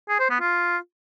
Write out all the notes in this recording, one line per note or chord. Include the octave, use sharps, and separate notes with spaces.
G#4
C5
B3
F4